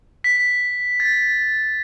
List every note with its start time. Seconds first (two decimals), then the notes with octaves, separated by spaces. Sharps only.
0.24 B6
1.00 A6